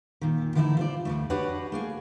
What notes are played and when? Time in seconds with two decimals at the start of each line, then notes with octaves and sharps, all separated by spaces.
0.21 A#2 D#3
0.55 D3 E3 A3 D#4 E4
0.77 F4 C5 D5
1.05 D2 B2 A3
1.30 D4 F#4 G4 B4 C#5 F#5
1.72 A3 A#3 G#4